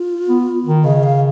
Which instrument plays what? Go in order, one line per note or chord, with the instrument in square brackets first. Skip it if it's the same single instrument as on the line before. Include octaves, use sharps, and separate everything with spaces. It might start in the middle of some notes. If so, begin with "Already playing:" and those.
Already playing: [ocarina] F4
[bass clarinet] B3
D#3
[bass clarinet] C#3 [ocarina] D#5
[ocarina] F5